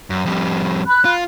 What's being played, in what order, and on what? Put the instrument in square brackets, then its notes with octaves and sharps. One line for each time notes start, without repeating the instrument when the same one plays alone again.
[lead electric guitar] F#2
F2 G3
[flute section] B5 F#6
[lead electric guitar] F4